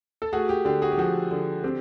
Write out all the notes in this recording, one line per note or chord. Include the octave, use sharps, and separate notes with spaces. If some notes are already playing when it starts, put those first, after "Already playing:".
A4
A3 F#4 G#4
G4
D3 G4
F#4 G#4
G4
F3 F#4
D3
C4 G4